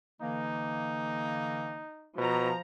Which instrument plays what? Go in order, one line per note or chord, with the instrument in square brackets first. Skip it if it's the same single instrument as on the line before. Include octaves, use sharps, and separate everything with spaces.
[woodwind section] D3 E3 A#3 [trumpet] D#4
[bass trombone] B2 [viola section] F3 A#5